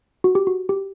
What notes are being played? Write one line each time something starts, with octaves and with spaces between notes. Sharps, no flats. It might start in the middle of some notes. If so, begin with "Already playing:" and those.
F#4
G4
F#4
G4